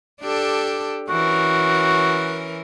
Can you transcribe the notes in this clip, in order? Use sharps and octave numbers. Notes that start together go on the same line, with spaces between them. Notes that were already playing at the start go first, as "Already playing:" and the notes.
D4 G4 A4
E3 C#4 F#4 A#4